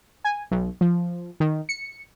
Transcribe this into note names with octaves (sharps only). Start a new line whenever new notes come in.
G#5
B1
F3
D#3
C#7